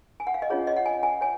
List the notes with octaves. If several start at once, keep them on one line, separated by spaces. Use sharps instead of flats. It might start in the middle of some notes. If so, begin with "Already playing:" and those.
G#5
F#5
F5
D#5
C#4 F4 G#4 C#5
D#5
F#5
G#5
G#5
C#5 G#5